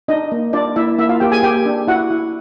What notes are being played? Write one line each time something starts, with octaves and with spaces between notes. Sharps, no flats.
D4 D#4 D#5
A#3
D4 F4 D5
A#3 E4 E5
A#3 E4 E5
F4 F5
A#3 G4 G5
G#4 G#5
A#3 G4 G5
D4
E4 F#4 F#5
E4